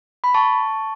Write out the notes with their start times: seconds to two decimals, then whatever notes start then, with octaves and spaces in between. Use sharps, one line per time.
0.24 B5
0.34 A5 C#6